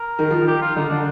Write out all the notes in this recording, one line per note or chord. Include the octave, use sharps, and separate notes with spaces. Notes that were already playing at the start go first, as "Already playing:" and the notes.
Already playing: A#4
D#3
F3
D#3
G4
F4
D3 D#4
D3 D4